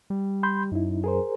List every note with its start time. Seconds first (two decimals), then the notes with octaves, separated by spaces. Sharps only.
0.10 G3
0.43 B5 C6 G6
0.72 F#2 D#4 E4
1.04 G#4 A#4 C5